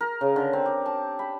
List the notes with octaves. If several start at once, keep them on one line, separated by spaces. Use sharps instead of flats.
A#4
C#3
D3
C4
G4
A5
B5